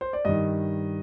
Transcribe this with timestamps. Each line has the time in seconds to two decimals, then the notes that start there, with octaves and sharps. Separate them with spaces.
0.01 C5
0.13 D5
0.25 G2 D#3 D#5